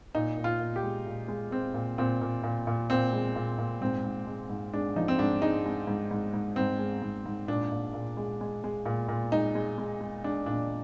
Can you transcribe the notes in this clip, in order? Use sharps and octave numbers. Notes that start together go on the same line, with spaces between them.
A#2 D#4
A#2
F4
A#2
G4
G#3
A#2
G#3
G#3 C4
A#2
A#2 C4
A#2
A#2
A#2
A#2 C4
G#3
A#2
A#2
G#2 C4
G#2
G#3
G#2
G#3 D4
F3 D#4
C4
G#2 D4
G#3 D#4
G#3
G#2
G#2
G#2
G#2 C4
G#3
G#2
G#2
A#2 D4
A#2
A#2
G#3
G#3
G#3
A#2
A#2
G#3 D#4
G#3
G#3
G#3
G#3 D4
A#2 D4